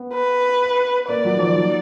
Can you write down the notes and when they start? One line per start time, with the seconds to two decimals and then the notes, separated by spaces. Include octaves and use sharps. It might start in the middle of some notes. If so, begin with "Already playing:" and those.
Already playing: B3
0.13 B4
1.08 A#3 D5
1.24 F#3
1.34 D#3
1.39 F3
1.56 F#3